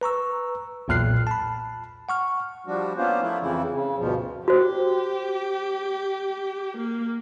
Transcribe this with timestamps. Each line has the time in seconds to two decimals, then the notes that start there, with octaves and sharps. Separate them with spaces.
0.01 B4 A#5 C#6 E6
0.88 B1 E2 A#2 F6 F#6 C7
1.27 A5 B5
2.09 F#5 C#6 F6
2.67 F3 G3 D4 F#4
2.96 A#3 B3 C#4 D4 F4 C5
3.21 F3 A3 E4 F4
3.41 F2 C#3 E3 F3 E4
3.72 C#3
3.98 D2 G2 B2 F3
4.48 F#4 G4 C5
6.78 A#3